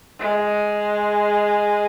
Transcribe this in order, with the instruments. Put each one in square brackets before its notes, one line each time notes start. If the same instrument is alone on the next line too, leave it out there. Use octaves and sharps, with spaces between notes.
[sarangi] G#3